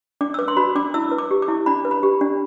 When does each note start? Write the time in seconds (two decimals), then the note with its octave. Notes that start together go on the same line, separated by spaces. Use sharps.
0.21 D4 D6
0.34 E6
0.39 B4 D6
0.48 C6
0.57 F#4 B5
0.75 D4 D6
0.94 E4 E6
1.11 B4
1.18 D6
1.31 G4
1.42 D6
1.48 E4
1.66 D4 B5
1.85 B4
1.91 B5
2.03 G4
2.21 D4